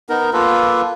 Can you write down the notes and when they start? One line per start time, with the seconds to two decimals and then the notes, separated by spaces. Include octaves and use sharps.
0.09 B3 D#4 A#4
0.33 A#3 F4 A4 B4